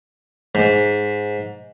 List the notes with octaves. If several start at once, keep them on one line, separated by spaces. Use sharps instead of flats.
G#2